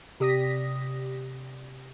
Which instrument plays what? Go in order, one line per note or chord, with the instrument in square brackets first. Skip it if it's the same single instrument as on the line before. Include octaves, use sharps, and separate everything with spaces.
[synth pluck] C3 G4 D5 D#6 A#6 B6